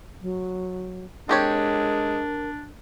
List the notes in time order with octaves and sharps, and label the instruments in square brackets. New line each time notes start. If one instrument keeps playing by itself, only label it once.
[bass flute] F#3
[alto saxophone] G#3 [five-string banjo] C4 G4 C#5 [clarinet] D4 [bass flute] A#4